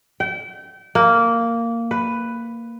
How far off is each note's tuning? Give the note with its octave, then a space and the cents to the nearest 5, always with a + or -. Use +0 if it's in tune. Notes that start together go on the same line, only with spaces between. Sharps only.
G5 -30
A#3 -10
B4 +5